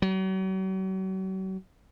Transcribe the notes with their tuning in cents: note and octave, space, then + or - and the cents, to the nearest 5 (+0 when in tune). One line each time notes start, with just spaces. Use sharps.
F#3 +40